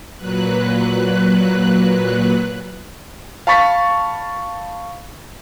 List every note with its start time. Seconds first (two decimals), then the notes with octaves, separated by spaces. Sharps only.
0.17 A#2 F#3 B4 F#6
3.47 F5 A5 B5 C#6 A6 B6